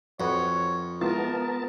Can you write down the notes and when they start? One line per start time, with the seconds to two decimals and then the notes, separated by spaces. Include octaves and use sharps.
0.20 F2 F#4 B4 C#5 F#5
1.01 G#3 B3 E4 F4 A#4 A5